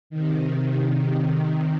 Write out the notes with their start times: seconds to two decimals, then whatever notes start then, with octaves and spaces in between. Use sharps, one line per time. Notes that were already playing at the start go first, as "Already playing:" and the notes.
0.10 C3 D#3